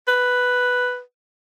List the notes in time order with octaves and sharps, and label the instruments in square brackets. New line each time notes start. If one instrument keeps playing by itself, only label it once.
[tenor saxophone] B4